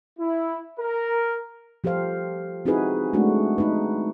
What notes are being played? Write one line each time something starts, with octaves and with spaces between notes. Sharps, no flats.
E4
A#4
F3 G4 A4 C5 F5
C4 D#4 E4 F#4 G#4 B4
G#3 A3 D4 F#4
D#4 B4